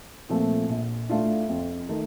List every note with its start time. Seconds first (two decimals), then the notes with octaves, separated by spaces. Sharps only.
0.29 A#2 F3 A3 C4
0.69 A#1
1.09 A2 A3 D4 F4
1.49 F2
1.89 D#3 A3 D#4